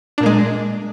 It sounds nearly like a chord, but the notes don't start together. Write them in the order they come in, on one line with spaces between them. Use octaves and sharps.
D4 A#2 A#3 G#3